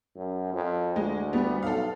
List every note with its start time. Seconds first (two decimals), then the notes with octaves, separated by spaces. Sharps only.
0.16 F#2
0.53 F2
0.96 D2 G#3
1.33 G3 B3
1.63 B1 A4 F5